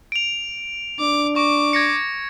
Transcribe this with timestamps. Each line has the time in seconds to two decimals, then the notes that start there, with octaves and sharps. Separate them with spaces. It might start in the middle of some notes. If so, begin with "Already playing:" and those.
0.12 D7 F7
1.00 D4 D6
1.36 C#6 D6
1.73 G#6 A#6 C#7